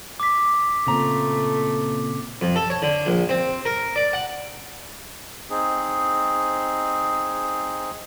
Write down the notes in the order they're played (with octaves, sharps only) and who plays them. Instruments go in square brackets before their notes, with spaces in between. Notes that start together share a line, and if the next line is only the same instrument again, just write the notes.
[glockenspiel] D6 B6
[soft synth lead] A#2 [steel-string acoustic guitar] C#3 C4 A#5 [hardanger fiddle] A3
[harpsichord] F2
A4
C#5
D3
A#1
C4
A#4
D5
F#5
[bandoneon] C4 D#4 G#4